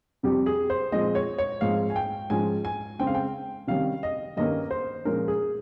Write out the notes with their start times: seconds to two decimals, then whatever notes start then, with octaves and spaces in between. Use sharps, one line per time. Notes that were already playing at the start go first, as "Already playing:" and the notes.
0.23 F2 C3 G3 G4
0.46 G#4
0.70 C5
0.92 A#2 F3 G#3 C4 D#5
1.15 C#5
1.38 C#5
1.61 G#2 F3 G#3 C4 F5
1.90 G#5
1.96 G5
2.30 G#2 F3 G#3 C#4 G#5
2.65 G#5
2.99 C#3 G#3 C4 G5
3.07 F5
3.15 G5
3.67 C3 D#3 G3 C#4 F5
4.03 D#5
4.37 G2 D#3 A#3 C#4 D#5
4.71 C5
5.05 A#2 F3 G#3 C#4 A#4
5.28 G#4